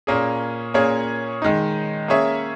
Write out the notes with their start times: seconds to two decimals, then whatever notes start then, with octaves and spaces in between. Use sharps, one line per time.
0.07 A#2 A#3 C#4 G#4
0.74 A#2 A#3 C#4 G#4 C#5
1.42 D#3 G#3 D#4
2.08 A#3 C#4 G#4 C#5 E5